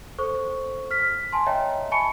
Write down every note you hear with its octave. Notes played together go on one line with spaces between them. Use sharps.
A4 C5 C#6
F6 B6
G#5 A5 C6
C#5 D#5 E5 G5 A#5
G#5 A5 B5 C#6 C#7